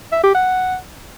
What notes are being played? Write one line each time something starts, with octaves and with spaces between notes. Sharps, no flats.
E5
G4
F#5